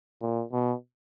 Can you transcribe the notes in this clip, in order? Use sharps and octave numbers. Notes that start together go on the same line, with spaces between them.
A#2
B2